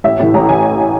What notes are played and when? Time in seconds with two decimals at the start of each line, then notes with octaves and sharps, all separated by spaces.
0.04 A1 E5
0.20 A2 E3
0.34 A1 A#5
0.49 E3 G#5